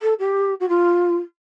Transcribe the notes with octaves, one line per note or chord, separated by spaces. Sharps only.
A4
G4
F#4
F4